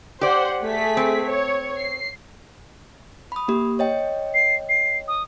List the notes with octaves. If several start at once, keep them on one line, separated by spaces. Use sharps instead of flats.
G4 C5 D5 F#5
A3 G#4 B6
C4
C#5
C7
B5 D#6
A#3 G4
C#5 D#5 G5
C7
C7
D#6